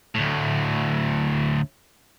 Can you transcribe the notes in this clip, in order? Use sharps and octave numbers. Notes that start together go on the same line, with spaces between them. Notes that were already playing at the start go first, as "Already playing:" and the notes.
D2 A2